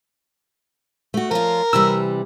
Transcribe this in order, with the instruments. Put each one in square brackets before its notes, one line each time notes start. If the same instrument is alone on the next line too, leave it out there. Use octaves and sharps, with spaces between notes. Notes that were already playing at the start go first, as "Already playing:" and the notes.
[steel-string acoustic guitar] A3 F#4
[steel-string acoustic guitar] F3 C#4 F4 [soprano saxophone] A#4
[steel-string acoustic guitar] C3 E3 G3 [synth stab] E6